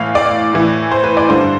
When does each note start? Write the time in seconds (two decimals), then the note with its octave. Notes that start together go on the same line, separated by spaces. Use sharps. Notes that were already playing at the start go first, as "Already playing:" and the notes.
Already playing: A2 E3 F5
0.15 D5
0.53 A2 E3
0.91 C5
1.04 B4
1.17 D5
1.29 G2 D3 C5